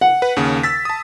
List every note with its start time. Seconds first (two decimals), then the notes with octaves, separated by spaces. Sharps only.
0.01 F#5
0.22 B4
0.36 D#2 C#3
0.63 E6 A6 B6
0.85 A5 D#6